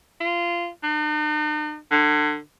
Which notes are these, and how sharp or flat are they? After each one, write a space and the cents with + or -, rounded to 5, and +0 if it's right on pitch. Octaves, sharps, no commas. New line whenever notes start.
F4 -15
D#4 -45
D3 +30